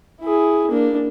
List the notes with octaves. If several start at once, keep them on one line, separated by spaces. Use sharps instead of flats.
E4 G#4
A#3 D4